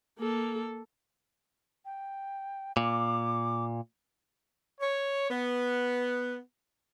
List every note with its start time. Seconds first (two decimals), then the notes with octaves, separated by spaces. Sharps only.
0.19 A#3 A4
1.85 G5
2.77 A#2 D6
4.80 C#5
5.31 B3